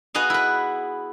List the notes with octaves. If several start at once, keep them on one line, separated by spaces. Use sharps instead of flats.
B3 F#4 G#4 D#5 F5
E4 B4